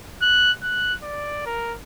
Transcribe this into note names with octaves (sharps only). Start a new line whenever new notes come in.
F#6
F#6
D5
A#4